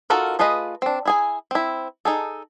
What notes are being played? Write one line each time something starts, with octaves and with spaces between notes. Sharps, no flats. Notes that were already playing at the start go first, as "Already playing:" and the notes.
D#4 F4 F#4 A4 A#4
A3 F4 G#4 B4 D#5
C4 D4
E4 G#4 G#5
C4 E4
D#4 G#4 A4